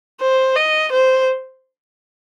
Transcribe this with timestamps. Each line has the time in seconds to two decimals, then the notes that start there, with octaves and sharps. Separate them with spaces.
0.21 C5
0.56 D#5
0.92 C5